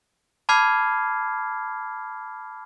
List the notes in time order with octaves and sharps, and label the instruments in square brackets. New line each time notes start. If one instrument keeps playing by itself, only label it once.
[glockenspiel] A5 B5 D6 F6 G#6 C7